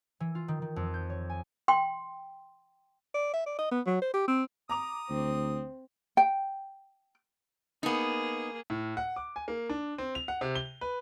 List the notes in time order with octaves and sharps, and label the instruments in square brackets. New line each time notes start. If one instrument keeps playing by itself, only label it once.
[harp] E3
F4
D#3
D#3
F2
G6
C#5
G#5
[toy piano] G5 C6
[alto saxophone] D5
E5
D5
D#5
B3
F#3
C5
G4
C4
[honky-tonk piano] A#5 D6 F7 [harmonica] D#6
[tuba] D2 [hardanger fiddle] C4
[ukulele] G5
[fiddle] A#3 G#4 [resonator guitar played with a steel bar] B3 D#4
[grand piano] A2
F#5
D6
G#5
A#3
D4
C4
F7
F#5
C3
G7
B4